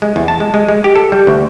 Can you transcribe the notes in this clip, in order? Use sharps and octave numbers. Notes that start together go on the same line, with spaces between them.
G#3
E2
A5
G#3
G#3
G#3
G4
A4
G3
D2